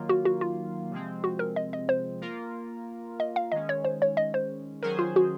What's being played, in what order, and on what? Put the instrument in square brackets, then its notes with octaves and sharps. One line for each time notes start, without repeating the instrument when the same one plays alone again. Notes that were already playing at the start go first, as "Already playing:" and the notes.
Already playing: [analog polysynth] D#3 F#3 A#3 F4
[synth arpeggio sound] F#4
F#4
F4
[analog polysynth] C3 F3 G#3 C4
[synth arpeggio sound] F#4
A#4
D#5
D#5
C5
[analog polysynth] A#3 F4 A#4
[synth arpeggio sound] D#5
F5
[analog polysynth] D#3 G#3 C#4 [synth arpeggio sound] D#5
[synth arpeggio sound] C#5
C5
C#5
D#5
C5
[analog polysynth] D#3 F#3 C#4 G#4 C5 [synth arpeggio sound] A#4
[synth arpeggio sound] F4
F#4